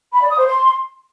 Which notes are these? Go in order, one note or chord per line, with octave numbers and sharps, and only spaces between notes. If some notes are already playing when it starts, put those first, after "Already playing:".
B5
D5
D#6
C5
C6